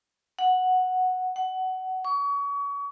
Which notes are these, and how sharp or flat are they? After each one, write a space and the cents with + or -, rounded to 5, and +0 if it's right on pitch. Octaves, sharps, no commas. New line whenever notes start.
F#5 -5
F#5 +20
C#6 +35